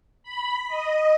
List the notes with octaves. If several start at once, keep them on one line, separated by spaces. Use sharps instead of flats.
B5
D#5